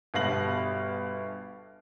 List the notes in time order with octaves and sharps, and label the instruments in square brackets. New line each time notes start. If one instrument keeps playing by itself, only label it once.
[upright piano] G1 B2 G3 F5 A#6 F#7